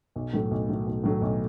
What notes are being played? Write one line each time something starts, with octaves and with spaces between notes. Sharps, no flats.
B1
A2 F#3 A3
B1
A2 F#3 A3
B1
A2 F#3 A3
B1